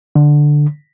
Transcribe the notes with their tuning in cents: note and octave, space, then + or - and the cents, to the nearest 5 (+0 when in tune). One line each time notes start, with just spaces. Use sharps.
D3 +5